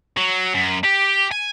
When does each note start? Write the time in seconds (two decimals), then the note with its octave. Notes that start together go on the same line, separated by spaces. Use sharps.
0.17 F#3
0.54 F#2
0.84 G4
1.32 G#5